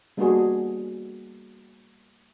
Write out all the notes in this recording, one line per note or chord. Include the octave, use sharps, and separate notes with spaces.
G3 A#3 B3 D4 F#4 G#4